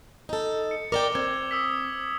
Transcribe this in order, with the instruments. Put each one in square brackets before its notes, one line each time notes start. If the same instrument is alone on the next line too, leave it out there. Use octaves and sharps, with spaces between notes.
[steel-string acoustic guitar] D#4 A4
[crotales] C#7
[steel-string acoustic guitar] A#4 D5 G5 [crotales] D6 F7 G7
[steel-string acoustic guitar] C4 [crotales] G#6
[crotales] D#6 E6 B6